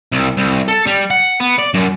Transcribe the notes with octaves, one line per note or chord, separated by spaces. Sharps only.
C2
C2
A4
G3
F#5
B3
D5
F#2